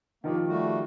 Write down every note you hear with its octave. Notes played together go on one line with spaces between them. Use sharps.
D#3 F3 A#3 G4
G3 A3 F#4